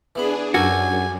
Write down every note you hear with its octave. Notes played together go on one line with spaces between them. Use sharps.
E3 B3 D4 G#4 B5
F#2 F#4 G4 A4 A#4 G#5